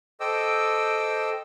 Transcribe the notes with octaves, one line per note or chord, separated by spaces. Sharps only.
A4 C5 D#5 G5 D6 E6